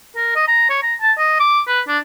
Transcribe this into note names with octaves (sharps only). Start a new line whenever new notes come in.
A#4
D#5
A#5
C#5
A#5
A5
D#5
D6
B4
D4